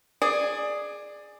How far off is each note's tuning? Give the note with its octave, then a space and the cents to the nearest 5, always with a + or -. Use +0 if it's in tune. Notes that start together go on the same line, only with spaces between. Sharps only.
G#4 +0 D5 +20